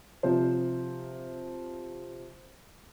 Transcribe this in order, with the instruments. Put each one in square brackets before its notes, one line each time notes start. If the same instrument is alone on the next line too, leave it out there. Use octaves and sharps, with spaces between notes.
[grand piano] C3 F3 C5